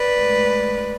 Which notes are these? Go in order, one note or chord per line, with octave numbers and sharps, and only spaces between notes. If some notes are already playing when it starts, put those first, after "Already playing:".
Already playing: B4 D5
A2 G#3